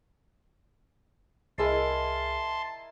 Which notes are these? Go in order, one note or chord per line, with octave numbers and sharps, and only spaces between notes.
C2 E4 G#4 A#4 D#5 A5 C6